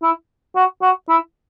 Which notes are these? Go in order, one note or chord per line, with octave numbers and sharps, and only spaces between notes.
E4
F#4
F#4
E4